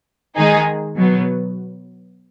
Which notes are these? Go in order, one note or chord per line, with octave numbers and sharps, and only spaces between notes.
D#3 G#3 D#4 G#4
B2 F#3 B3